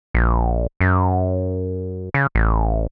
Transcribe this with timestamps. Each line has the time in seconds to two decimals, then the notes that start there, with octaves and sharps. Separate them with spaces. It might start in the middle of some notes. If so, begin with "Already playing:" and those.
0.14 A#1
0.81 F#2
2.14 C#3
2.35 A1